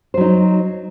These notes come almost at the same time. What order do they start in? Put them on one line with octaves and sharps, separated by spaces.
C5 F#3 D#4